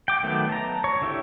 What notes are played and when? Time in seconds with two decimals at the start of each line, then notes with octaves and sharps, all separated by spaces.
0.08 G5 D6
0.23 D#3 F#3 A3 B3
0.49 A5 A#5
0.84 C#5
1.02 D3 E4 G4